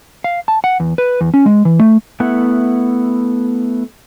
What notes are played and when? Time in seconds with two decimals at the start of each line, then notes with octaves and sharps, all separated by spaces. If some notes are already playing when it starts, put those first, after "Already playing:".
0.24 F5
0.48 A5
0.64 F#5
0.80 E2
0.98 B4
1.21 E2
1.34 C#4
1.46 G#3
1.65 E3
1.79 A3
2.20 A3 B3 E4 F#5